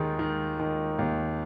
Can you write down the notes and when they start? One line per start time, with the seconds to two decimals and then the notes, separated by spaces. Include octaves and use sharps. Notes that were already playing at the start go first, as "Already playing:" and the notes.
Already playing: D#2 D#3 G#3
0.19 D#3
0.59 D#3
0.99 D#2